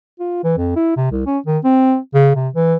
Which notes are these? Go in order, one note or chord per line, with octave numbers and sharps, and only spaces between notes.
F4
E3
F2
E4
C3
C2
C#4
D#3
C4
C#3
C3
E3